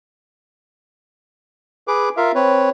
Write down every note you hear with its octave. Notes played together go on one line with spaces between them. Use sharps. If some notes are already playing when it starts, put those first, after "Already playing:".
G#4 B4 D6
F4 A#4 E5 F5
C4 B4 C#5